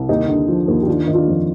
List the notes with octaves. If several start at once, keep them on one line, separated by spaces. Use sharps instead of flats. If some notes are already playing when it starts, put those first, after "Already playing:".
Already playing: C2
D#2 D#4 G4
D3
F3
D#2
G4
D#3 D4 F4
D#3
D4 F4
F2